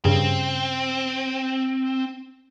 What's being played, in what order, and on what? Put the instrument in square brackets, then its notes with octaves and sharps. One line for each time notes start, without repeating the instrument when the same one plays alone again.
[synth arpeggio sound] G2 C#3 [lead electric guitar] C4